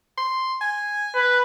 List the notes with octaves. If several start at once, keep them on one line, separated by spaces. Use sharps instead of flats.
C6
G#5
B4